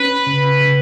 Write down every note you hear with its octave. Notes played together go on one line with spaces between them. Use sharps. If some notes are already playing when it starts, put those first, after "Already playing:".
Already playing: C#4 B4
C#3
C#3